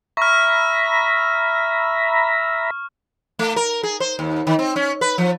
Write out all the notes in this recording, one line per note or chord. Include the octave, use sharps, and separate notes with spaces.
E5 A#5 B5 C#6 F6
A3
A#4
G#4
C5
D#2
D#3
C4
C#4
B4
F3